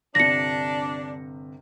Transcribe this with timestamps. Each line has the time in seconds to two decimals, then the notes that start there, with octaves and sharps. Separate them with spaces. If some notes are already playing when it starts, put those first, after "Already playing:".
0.15 G1 C3 D4 A#6 C#7